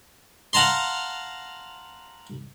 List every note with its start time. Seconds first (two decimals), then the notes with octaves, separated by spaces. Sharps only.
0.53 F5 F#5 A5 A#5 C6